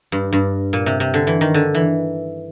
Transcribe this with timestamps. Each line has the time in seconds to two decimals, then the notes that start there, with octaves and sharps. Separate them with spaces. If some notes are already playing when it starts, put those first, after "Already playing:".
0.12 G2
0.33 G2
0.73 A#2
0.86 C3
1.00 C3
1.14 D3
1.27 E3
1.41 D#3
1.54 D3
1.75 E3